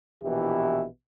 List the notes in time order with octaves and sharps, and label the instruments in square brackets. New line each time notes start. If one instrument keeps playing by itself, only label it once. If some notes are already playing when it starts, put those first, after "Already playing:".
[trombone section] A#1 B2 E3 E4 G4